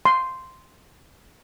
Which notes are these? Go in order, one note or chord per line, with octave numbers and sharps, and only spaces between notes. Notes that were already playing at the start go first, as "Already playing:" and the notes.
C6